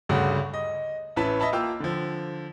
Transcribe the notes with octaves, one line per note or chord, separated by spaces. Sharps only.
D2 G2 C#3 A3 F#4
D#5
A1 C#4 E4 B4 A5
D#5 E5 A5 B5
A#3 F4 G5 E6
D3 F3